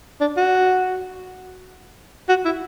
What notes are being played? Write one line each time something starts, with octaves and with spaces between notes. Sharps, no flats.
D4
F#4
F#4
E4